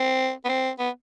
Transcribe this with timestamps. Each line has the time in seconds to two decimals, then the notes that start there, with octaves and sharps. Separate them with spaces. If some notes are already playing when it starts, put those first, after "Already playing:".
Already playing: C4
0.45 B3
0.49 C4
0.79 B3